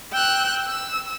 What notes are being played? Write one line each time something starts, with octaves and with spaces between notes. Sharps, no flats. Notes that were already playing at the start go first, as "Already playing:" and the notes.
G5 E6 F#6
E6